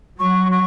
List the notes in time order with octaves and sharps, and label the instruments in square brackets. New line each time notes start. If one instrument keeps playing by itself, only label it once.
[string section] F#3 [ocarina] C#6
[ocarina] C#6